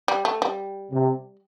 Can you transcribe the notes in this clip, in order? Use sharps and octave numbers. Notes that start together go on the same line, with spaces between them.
G3
A3
G3
C3